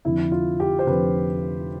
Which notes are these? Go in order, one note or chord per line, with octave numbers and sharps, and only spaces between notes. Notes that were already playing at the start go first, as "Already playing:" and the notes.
F1 F2 D3 E4
F4
G4
C5
F1 F2 D3 B4